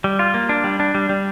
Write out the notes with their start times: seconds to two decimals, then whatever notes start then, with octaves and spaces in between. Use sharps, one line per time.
0.04 G3
0.19 F4
0.34 A#3
0.49 D4
0.64 G3
0.80 D4
0.95 G3
1.09 G3